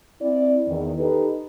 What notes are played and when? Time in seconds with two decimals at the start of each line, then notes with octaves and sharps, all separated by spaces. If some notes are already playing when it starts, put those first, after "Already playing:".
0.21 C4 E4 D5
0.67 E2 D#3
0.98 D#4 G4 A4 B4